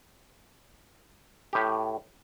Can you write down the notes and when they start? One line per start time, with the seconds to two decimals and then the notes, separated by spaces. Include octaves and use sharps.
1.53 A2 G4